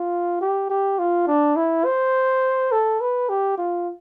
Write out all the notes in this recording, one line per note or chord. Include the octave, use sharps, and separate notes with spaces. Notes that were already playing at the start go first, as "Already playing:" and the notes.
Already playing: F4
G4
G4
F4
D4
E4
C5
A4
B4
G4
F4